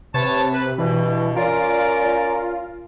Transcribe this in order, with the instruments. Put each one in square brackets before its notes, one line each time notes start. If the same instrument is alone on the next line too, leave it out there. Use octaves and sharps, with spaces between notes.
[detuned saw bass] C3 [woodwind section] B4 C#5 A5
[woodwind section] B4
[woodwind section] G2 B2 [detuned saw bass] E3
[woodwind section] C#4 A#4 D5 [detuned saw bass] F4